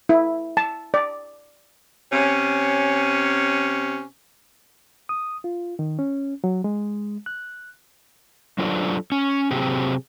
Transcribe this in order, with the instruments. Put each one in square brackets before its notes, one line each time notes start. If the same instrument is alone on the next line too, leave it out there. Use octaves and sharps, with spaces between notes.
[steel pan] E4
A5
D5
[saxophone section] C3 C#4
[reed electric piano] D#6
F4
D#3
C#4
F#3
G#3
F#6
[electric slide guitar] F#3 D4 F4 A4 C5 D5
C#4
C3 F#3 C4 G4 G#4